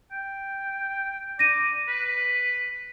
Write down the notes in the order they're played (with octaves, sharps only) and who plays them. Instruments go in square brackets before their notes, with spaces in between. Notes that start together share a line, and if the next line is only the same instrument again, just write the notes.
[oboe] G5
[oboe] D5 [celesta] A#6 D#7
[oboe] B4